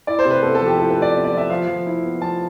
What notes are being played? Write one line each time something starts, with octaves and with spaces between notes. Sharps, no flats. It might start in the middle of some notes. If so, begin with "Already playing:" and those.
E4 D5
C5
C3
B4
B3 A4
A4
F3
G4
E4 A4
B4
C3 D5
B3
D5
F3
E5
F3 F5
F3
E4
B3
F3 A5